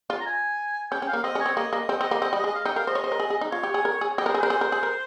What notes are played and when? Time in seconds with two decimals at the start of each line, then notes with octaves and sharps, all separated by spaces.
0.10 F4
0.21 A#5
0.26 G#5
0.91 C#4 G5
1.02 C#4
1.08 F5
1.13 A#3
1.24 C4 D#5
1.35 C#4
1.40 C#5
1.46 C4
1.57 A#3 D#5
1.73 A#3 D#5
1.89 C4
2.01 C4
2.11 A#3
2.22 C4
2.33 G3
2.44 G#3
2.47 D#5
2.55 F5
2.65 D#4 G5
2.76 A#4 F5
2.87 C5 D#5
2.95 C#5
3.04 C5
3.12 A#4
3.20 G#4
3.30 G#4
3.41 D#4
3.52 F4 C#5
3.63 G4
3.74 G#4
3.85 A#4
4.01 G#4
4.18 G4 D#5
4.26 A#4
4.29 C5
4.34 G#4
4.40 A#4 C5
4.50 G#4
4.61 A#4
4.72 G#4
4.83 A#4